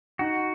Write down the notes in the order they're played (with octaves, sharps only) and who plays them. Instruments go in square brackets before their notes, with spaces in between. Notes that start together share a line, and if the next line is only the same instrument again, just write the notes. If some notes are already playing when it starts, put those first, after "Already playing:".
[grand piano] D#4 [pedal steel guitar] F#4